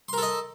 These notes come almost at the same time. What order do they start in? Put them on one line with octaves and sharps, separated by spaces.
C6 A#4 A4 D#5